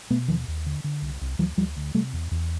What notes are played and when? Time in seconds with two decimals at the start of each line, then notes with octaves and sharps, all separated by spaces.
0.10 B2 A3 B3
0.28 D#2 D#3 F3
0.48 D#2
0.66 D3
0.84 D3
1.02 C2
1.21 C2
1.39 D2 E3 F#3
1.57 D2 F3 G3
1.76 D2
1.95 C3 G3 A3
2.13 E2
2.31 E2